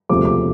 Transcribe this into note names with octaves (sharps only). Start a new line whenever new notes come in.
E1 D2 C3 F3 D6
D6